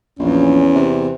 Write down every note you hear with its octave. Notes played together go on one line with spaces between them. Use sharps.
A#1 E2 C#4
C3